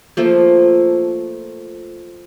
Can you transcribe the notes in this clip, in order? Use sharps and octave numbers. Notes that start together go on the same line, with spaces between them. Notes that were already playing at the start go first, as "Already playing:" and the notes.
F3 A3 A#3